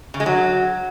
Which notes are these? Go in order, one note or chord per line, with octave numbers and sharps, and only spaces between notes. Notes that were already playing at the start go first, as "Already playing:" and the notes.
C#3
G#3
F#3